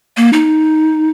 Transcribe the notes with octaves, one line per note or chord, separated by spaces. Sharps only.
A#3
D#4